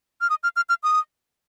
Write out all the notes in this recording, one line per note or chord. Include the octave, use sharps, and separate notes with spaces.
F6
D#6
F6
F6
F6
D#6